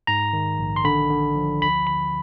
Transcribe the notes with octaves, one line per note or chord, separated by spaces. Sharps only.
G#2 A#5
D#3
A#1
C6
D3 B5
D3
F3
D2 B5
D3 B5